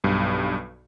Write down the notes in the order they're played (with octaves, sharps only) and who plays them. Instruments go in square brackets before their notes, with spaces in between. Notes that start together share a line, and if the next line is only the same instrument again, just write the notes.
[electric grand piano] B1 G2